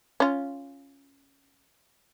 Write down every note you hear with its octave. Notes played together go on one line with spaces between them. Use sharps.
C#4 F4